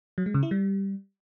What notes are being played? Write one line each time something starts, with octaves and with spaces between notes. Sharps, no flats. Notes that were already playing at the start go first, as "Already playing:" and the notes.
F#3
G#3
C#3
E4
G3